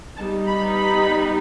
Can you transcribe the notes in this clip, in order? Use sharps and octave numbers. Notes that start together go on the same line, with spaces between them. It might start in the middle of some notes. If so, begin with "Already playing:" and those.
G3 B3 D#4 A5
B5
B5